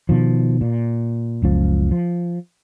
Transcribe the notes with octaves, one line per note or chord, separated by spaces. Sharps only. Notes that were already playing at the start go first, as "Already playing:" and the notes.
B2 D#3 F3
A#2
F#1 C#2 F3
F3